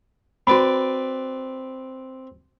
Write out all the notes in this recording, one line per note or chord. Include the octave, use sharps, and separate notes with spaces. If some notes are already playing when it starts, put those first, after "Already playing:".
C4 F#4 B4 D5 B5